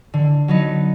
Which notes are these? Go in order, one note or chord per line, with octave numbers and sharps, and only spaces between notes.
D3
F#3 B3 D#4